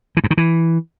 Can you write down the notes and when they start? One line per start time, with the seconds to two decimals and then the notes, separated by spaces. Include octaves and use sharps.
0.17 E3
0.24 G2
0.31 D#3
0.37 E3